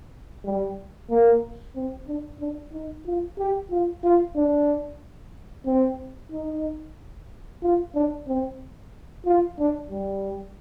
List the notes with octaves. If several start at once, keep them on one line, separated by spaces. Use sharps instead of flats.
G3
A#3
C4
D4
D4
D#4
F4
G4
F4
F4
D4
C4
D#4
F4
D4
C4
F4
D4
G3